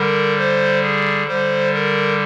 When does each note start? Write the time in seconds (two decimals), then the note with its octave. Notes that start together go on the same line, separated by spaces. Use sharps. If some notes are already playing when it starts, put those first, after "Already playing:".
Already playing: D3 G3 A#4
0.38 C5
0.82 G#4
1.28 D3 G3 C5
1.73 A#4